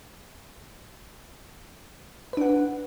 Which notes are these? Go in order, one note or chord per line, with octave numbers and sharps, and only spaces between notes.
D4 B4 F#5